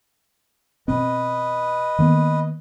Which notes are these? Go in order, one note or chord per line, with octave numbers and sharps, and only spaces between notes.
B2 C4 B4 D#5
D#3 A#3 B3